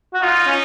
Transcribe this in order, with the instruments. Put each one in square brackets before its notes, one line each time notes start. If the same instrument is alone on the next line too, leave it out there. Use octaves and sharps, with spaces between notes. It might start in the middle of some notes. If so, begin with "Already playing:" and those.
[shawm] F#4
[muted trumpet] D#4 [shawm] F4
[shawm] C#4